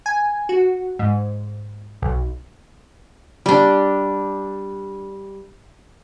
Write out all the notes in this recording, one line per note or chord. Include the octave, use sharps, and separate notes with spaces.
G#5
F#4
G#2
B1
G3 D4